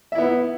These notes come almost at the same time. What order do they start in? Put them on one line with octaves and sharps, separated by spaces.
E5 E4 B3